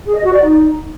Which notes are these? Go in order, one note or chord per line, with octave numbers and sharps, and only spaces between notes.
G#4
D#5
F#4
D5
D#4